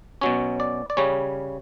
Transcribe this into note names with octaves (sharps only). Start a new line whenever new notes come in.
B2 F#3 C#4 C#5
D5
D5
C#3 G3 C#4 C#5